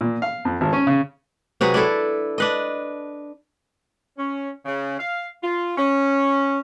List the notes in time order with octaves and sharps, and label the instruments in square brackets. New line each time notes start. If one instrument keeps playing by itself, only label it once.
[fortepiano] A#2
F5
F2
G#1
C#4
C#3
[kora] C3 F#3 G#4 B4
D4 E4 A4
D4 B4 D#5
[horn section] C#4
C#3
F5
F4
C#4